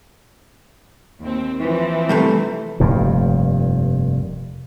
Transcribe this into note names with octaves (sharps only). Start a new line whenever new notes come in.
D#2 C4
E3 F3 C4
G2 C3 A3
F1 G2 A#2